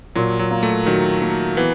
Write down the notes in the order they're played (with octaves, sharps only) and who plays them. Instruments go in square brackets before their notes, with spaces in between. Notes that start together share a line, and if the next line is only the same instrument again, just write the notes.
[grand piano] A#2 [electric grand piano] F#3
[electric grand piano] F#3
[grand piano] A#3
[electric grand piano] A3
[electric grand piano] D#3 [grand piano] F#3
[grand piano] A#3
[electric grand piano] E3 [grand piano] B3